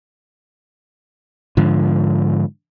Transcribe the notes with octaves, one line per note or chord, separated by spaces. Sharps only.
G#2 D3 F3